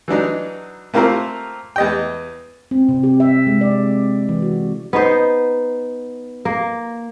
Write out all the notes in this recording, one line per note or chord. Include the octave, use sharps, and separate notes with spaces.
E3 F#3 D4 D#4
A3 A#3 C4 F4 A#4 C5
E2 D#5 G5
C4
C3
G4
E5
G#3
D5
E3
F#4
B3 D#4 C5
A#3